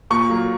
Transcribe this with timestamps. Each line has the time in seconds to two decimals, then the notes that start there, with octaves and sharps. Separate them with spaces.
0.10 A#2 C#6
0.29 F#3 A#3